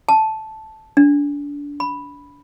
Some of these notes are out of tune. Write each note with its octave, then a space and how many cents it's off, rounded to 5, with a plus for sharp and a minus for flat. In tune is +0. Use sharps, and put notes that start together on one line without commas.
A5 -5
D4 -25
B5 +0